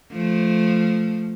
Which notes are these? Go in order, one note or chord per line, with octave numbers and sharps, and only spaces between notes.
F3 A3